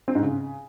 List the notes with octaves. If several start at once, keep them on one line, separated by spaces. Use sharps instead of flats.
C4
G#2
C#3